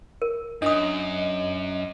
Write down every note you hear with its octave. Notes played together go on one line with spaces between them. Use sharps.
A#4
F#2 D4 D#5 D#6